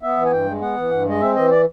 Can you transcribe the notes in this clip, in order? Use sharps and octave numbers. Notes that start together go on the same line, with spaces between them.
B3 E5
E3
G#5
G2 G5
G#3
B3 F#5
E3
G2
G#3 D#5
C4 E5
E3 D#5
D5